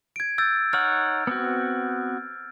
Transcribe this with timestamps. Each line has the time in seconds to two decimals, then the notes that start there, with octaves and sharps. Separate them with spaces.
0.16 G#6 D7
0.38 E6 G6 A6
0.73 D#4 C#5 F#5 F6
1.27 B3 C4 F#4